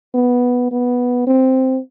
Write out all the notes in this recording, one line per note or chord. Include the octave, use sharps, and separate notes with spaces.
B3
B3
C4